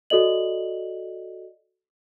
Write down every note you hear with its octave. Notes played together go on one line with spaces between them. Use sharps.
F#4 A4 D5 D#5 F#7